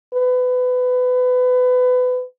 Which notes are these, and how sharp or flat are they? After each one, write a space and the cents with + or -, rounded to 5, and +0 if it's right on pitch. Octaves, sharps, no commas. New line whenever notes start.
B4 +25